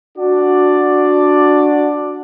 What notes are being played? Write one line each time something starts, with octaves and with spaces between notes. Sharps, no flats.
D4 F#4 D5